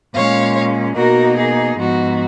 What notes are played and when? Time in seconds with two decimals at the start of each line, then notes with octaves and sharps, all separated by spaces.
0.14 A#2 G#3 C#4 C#5 F5
0.96 B2 A#3 D#4 F#4 A#4
1.37 G#4
1.78 G#2 F3 B3 D#4 F#4